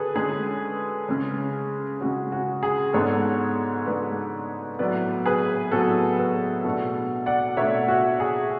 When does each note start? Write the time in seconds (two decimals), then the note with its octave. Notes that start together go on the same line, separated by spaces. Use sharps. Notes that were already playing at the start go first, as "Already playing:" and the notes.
Already playing: D3 C#4 G#4 A4 B4 C#5
0.15 D3 G#3 C#4 G#4
1.09 C#3 G#3 C#4
2.00 C#3 G#3 C#4 F#4
2.32 F#4
2.63 G#4
2.93 G#2 G#3 B3 D4 A4 C#5
3.86 G#2 G#3 B3 D4 B4 D5
4.79 A2 F#3 B3 B4 D5
5.26 G#4 B4
5.71 A2 F#3 B3 F#4 A4
6.19 G#4 B4
6.64 B2 A3 D4 F#4 A4
7.26 D5 F#5
7.57 B2 A3 D4 C#5 E5
7.88 F#4
8.20 G#4